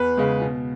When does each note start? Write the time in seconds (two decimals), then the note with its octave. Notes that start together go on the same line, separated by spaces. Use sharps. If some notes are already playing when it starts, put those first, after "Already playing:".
Already playing: E2 B4
0.17 C#3 G#3
0.41 B2